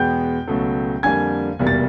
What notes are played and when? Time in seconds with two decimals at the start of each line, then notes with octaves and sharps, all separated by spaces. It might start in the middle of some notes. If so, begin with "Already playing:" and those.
Already playing: E2 B2 G#3 B3 G5 G6
0.47 C#2 B2 F#3 A3
1.03 F2 D3 G3 A#3 G#5 G#6
1.59 F1 E2 B2 G3 A#3
1.67 A6